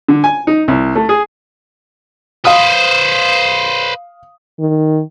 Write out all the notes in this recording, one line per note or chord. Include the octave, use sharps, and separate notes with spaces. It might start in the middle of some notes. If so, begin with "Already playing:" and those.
D3
G#5
D#4
C2
A3
G#4
B4 C5 F5 D#6
D#3